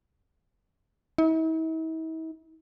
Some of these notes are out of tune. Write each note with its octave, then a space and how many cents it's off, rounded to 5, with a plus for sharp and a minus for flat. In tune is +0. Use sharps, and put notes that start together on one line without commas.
E4 -45